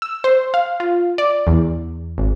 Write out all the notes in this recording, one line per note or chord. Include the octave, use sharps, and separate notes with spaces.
E6
C5
F5
F4
D5
E2
G#1